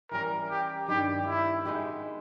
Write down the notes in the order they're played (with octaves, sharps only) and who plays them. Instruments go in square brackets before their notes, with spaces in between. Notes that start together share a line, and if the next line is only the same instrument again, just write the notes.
[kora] E3 G3 C#4 [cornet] A#4
[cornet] G4
[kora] G2 D#3 G3 [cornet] G4
[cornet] E4
[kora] G#3 B3 D#4 G4